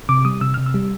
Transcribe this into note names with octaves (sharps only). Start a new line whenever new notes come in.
C3 D6
G3 D#6
C3 E6
C3 F6
E6
G3